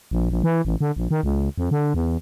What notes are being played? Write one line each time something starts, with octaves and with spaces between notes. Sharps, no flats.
A#1
A#1
E3
A1
D3
A#1
D#3
C#2
F2
D3
E2